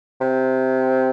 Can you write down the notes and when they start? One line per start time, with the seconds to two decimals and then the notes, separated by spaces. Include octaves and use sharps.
0.21 C3